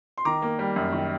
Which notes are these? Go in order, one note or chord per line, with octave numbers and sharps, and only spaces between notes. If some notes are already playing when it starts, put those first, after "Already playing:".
C6
D#3 A#5 D6
A#3
G3
F#2
D#3